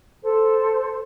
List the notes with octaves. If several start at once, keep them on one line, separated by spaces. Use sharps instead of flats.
A4 C5